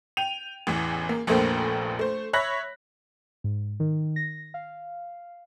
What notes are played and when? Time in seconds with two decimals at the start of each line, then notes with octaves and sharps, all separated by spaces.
0.17 G5 D#7 F7
0.67 A1 E2 E3
1.09 A#3
1.27 F1 A#1 A#2 A3 A#3 C5
1.99 A3 C5
2.33 C#5 E5 B5 F#6 A#6 B6
3.44 G#2
3.80 D#3
4.16 A#6
4.54 F5